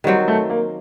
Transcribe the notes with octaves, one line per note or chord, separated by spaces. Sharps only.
D#3 F#3 G3 C4
A3
A#3